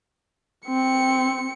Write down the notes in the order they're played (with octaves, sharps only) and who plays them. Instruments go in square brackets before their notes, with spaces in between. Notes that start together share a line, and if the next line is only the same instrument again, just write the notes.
[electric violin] C4 C#7